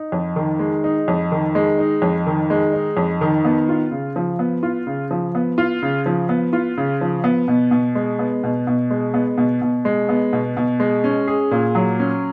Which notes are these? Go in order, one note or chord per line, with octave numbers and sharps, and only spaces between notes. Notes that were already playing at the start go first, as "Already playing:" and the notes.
Already playing: D#4
F2
D#3
G#3
D#4
F2
D#3
G#3
D#4
F2
D#3
G#3
D#4
F2
D#3
B3
F4
C#3
F3
B3
F4
C#3
F3
B3
F4
C#3
F3
B3
F4
C#3
F3
B3
B2
B2
G#3
B3
B2
B2
G#3
B3
B2
B2
G#3
B3
B2
B2
G#3
C#4
G#4
A#2
F#3
C#4